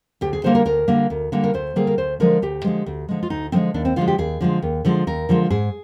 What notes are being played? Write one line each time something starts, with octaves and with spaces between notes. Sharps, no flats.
D2 G4
G#4
D3 G3 A#3 C5
A#4
D2 A#4
D3 G3 A#3
D2
D3 G3 A#3
A#4
D2 C5
D3 G3 A#3 G#4
A#4
D2 C5
D3 F3 G#3 A#4
D2 G4
D3 F3 G#3
D2
D3 F3 G#3
F4
D2 D#4
D3 F3 G#3 C4
D#2 D4
C4
D3 F3 G#3 F4
G4
D#2 G#4
D3 F3 G#3
D#2
D3 F3 G#3
D#2 A#4
D3 F3 G#3
G#2 G#4